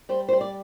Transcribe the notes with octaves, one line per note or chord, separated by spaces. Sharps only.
G3 C5
G3 C5
D5